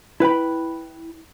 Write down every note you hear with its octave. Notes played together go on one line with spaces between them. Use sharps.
E4 B4 G5 B5